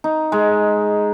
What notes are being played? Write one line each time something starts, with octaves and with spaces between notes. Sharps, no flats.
D#4
G#3